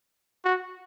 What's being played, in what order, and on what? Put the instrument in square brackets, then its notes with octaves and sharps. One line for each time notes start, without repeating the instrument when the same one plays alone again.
[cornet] F#4